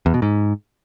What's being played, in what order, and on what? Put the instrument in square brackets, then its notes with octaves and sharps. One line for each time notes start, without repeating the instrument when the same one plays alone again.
[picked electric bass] E2
B2
G#2